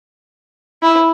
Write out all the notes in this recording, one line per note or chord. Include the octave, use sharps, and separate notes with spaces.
E4